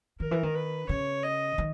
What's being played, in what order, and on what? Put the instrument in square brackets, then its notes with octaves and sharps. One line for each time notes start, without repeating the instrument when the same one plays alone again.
[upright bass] D#3 [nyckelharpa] A#4
[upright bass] E3
D#3
[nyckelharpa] B4
[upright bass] C#3 [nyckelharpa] C#5
[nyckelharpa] D#5
[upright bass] D#3